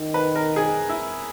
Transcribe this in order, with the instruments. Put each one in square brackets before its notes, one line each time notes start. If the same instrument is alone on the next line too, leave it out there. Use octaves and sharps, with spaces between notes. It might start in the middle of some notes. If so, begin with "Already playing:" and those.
Already playing: [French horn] D#3
[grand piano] B4
A#4
G#4
E4